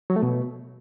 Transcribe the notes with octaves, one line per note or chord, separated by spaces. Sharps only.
F#3
A3
B2